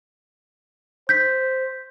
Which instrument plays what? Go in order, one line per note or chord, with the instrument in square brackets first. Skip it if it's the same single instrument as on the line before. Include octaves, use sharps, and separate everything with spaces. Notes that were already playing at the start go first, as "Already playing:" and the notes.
[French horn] C5 [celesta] G6 B6